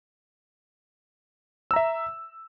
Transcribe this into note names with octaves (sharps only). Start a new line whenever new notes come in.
E5 A#5 E6